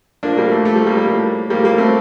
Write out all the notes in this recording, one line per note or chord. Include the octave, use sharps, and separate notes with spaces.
A#2 F3 A#3 D4
G3 A#3
A3
A#2 F3 A3
G3
G3 A#3
G3 A#3
A2 F3
A2 F3 G3 A#3
G3 A#3
A3 C4